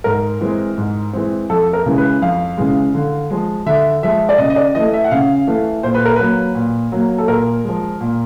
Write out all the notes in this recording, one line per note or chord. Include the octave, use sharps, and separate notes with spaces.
G#2 A#4
E3 G#3 C4
G#2
E3 G#3 C4
F2 A4
A#4
C#3 E3 G#3
B4
F2 F5
C#3 E3 G#3
D3
F3 G#3
D3 E5
F3 G#3 E5
D5
C#3 D#5
D#5
D5
E3 A3 D#5
E5
F#5
C#3 F5
E3 A3
A#2 C5
B4
A#4
F#3 A#3 B4
A#2
F#3 A#3
A4
A#2 A#4
F3 G#3
A#2